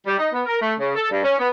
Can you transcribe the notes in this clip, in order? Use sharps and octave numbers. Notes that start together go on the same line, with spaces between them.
G3
D#4
B3
A#4
A3
C#3
A4
G2
C#4
B3